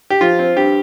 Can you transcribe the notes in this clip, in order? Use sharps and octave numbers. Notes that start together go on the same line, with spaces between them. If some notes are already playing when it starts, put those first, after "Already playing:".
G4
F3 F4
C4
G2 G4